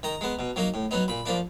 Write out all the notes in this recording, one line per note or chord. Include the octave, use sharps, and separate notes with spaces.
D#3 A#5
G#3 B3
B2
F#3 A#3 D#4
A2
F#3 B3 D#4
A#2 B5
F3 A#3 D4